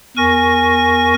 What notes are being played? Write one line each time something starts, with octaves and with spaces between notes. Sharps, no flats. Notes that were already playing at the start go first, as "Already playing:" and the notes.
E2 A#4 G#5 C#6 A#6